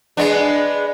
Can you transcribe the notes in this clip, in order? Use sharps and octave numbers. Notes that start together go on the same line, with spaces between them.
G#3 B3 D4